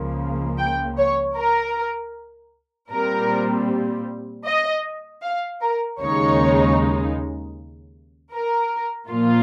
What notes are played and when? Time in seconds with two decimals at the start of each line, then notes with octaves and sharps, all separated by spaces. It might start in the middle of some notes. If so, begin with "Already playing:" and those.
Already playing: C#2 C#3 F3 A#3
0.58 G5
0.97 C#5
1.35 A#4
2.90 A#2 G3 C4 A#4
4.45 D#5
5.22 F5
5.61 A#4
6.00 D#2 C#3 G#3 D#4 C#5
8.33 A#4
9.09 A#2 F3 A#3 F4